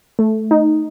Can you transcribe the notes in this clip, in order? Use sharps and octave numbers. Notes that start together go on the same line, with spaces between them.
A3
D#4